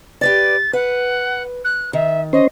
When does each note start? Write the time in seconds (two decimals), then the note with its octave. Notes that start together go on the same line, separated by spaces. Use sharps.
0.21 G4 B4 D5 A6
0.73 B4 F#5
1.64 F#6
1.93 D#3 E5
2.33 C#4 C5 D#5